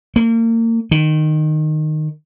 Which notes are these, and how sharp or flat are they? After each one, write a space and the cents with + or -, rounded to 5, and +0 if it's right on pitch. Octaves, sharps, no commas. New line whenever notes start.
A#3 -35
D#3 -15